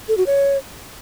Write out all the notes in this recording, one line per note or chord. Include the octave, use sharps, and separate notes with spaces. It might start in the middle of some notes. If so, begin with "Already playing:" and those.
A4
F#4
C#5